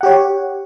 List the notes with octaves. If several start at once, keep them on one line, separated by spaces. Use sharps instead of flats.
G4 C#5 F#5